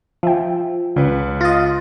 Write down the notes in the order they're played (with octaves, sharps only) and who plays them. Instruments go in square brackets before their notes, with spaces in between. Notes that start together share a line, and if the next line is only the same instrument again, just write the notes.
[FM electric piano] F3 [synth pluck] E5 G5
[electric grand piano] C#2 B4 [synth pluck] C#3
[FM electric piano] F4 D#5 [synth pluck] A6